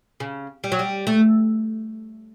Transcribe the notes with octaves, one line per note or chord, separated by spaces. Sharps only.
C#3
G3
F#3
G3
A3